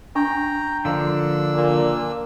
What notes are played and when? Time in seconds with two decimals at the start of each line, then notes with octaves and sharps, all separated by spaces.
0.15 D4 G5 A#5 C#6
0.85 D3 F3 A#3 D4 F5 E6
1.54 A#2